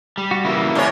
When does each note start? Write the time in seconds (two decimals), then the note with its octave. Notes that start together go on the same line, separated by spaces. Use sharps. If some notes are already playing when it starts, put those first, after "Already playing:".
0.17 G3
0.31 F#4
0.45 C#3 E3 A#3 E4
0.75 E2 C3 C#5